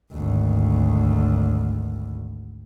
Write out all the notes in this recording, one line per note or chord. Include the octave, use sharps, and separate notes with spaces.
G#1 D2